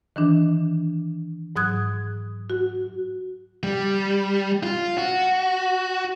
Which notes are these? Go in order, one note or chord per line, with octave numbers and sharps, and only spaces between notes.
D#3 E3 D4
G#2 F#3 D#6 F#6 G#6
F#4
G3
F4
F#4